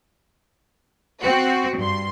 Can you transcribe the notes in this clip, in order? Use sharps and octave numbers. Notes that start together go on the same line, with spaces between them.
C4 F#4
G2 C6